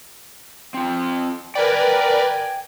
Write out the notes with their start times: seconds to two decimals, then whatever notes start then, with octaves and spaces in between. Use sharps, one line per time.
0.74 C4 F4
1.55 A#4 B4 D5 G5 G#5